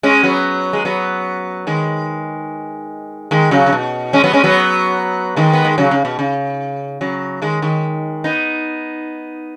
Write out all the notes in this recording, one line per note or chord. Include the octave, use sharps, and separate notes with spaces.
G#3 C#4
F#3 B3
G#3
F#3 B3
D#3 G#3
D#3 G#3
C#3 F#3
C#3
B2
G#3 C#4
F#3 B3
G#3 C#4
F#3 B3
D#3 G#3
B3
G#3
C#3 F#3
C#3
B2
C#3
C#3 F#3
D#3 G#3
D#3 G#3
B3 D#4